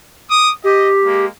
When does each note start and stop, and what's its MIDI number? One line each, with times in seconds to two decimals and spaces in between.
0.29 0.51 86
0.29 0.51 87
0.64 1.25 67
0.64 0.90 75
1.04 1.28 56
1.04 1.28 58